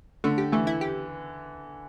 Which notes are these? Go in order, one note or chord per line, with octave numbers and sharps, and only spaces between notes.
D3 A3
G4
E3 A3
E4
G4